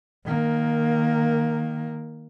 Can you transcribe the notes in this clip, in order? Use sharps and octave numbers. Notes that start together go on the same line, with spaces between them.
D#3 A#3